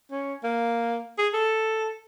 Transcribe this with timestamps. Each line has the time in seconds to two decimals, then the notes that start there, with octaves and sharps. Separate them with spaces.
0.11 C#4
0.44 A#3
1.18 G#4
1.34 A4